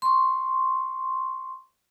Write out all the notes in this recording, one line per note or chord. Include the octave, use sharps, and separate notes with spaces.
C6 C#6